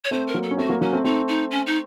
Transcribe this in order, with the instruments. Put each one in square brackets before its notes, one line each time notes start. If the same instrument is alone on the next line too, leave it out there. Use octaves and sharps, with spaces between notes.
[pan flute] C#5
[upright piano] A3 C4 [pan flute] C5
[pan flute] A#4
[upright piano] F#3 A#3
[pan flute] A4
[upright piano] C#4
[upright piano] A3 C4 [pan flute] F#4
[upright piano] F#3 A#3
[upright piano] F#3 A#3 [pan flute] C#4
[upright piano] A3 C4
[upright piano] A3 C4 [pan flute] D#4
[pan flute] D#4
C#4
D#4